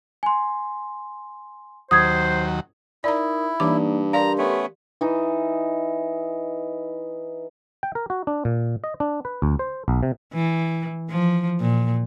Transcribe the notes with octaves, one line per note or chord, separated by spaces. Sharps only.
G#5 C6
D#2 F#3 C5 D#6 G#6
D#4 E4 A#4 D5 A#5 D#6
G2 E3 A#3 D#4 D5 D6
G4 A#4 D5 F5 A#5 C6
A3 B3 C#4
E3 D#4
G5
A#4
F#4
D4
A#2
D#5
D4
B4
D2
C5
B1
C3
E3
F3
A#2